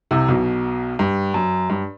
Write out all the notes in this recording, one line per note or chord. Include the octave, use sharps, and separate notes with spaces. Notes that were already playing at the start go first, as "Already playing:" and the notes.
C2 C3
B1 B2
G2
F#2
G2